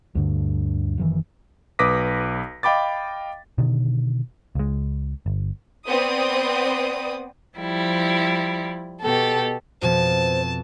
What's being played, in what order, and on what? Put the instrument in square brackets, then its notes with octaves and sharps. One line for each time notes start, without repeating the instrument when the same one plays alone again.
[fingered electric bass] D2 G2 D3
F#1 D#3 E3
[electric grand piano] B1 B4 D6 D#6 A#6 B6
D#5 F5 G5 B5 D6 A6
[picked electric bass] B2 D3 D#3
C#2 G#3
G1
[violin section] B3 C4 D5 D#6
[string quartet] F3 G3 E4
B2 G4 A4
[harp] F2 B2 F3 [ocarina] C5 [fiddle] A5